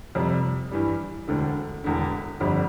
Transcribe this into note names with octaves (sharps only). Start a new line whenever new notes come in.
F2 C3 G3
G2 E3 G3
E1 D2 D3
E1 E2 D3
G1 F2 D3 G3